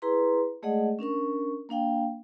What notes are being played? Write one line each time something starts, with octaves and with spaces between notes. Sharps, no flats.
E4 G#4 B4 A#5 C6
G#3 A3 G#4 D5 D#5 F#5
C#4 D4 A#4 C#6
A#3 D4 F5 G5